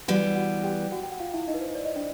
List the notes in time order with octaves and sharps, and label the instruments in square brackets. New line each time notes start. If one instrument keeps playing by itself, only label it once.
[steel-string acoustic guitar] E3 G3 B3 [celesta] F#4 F#5
[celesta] F#4 F#5
G4 G5
F#4 F#5
G5
F#5
F4 F5
E4 E5
D#4 D#5
B4
C5
D5
D#5
D4 D5